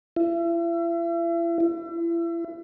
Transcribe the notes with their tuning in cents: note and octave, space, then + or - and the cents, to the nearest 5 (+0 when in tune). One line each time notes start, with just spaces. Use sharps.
E4 +40
E4 +35